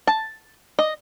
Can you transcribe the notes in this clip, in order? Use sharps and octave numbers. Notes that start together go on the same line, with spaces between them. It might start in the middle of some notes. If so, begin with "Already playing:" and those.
A5
D#5